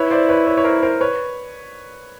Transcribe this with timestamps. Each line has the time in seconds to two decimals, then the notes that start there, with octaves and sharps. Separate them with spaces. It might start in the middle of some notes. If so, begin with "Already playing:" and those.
Already playing: E4 B4 C#5
0.11 C5 D5
0.29 B4 C#5
0.47 B4 C#5
0.57 C#5
0.64 A#4 C5
0.82 A#4 C5
1.01 B4 C#5